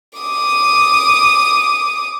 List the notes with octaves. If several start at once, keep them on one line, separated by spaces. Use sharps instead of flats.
D6 D#6